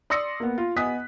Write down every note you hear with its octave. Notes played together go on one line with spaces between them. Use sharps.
D5 C6 D#6 E6 A#6 C#7
A#3 B3
F4
B3 D#5 G#5 D#6 F#6 B6